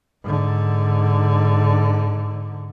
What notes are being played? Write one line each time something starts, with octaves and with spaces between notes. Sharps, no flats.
G#2 D3